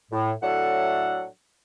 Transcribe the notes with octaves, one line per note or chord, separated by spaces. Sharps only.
A2
A2 F#3 D4 A4 E5 F#5